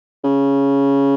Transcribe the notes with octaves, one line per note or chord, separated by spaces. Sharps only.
C#3